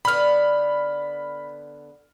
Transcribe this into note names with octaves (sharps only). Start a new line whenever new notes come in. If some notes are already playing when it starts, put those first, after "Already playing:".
D3 B3 B5 F6